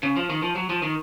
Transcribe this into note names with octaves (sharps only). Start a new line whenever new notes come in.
C#3
F3
D#3
F3
F#3
F3
D#3